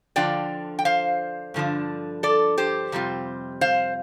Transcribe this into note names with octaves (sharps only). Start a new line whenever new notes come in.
D3 F3 D4 F4 D5 G5
G5
C5 F5
G2 D3 F3 D4
A4 D5
G4 C5
F2 C3 G3 C4 F4
C5 F5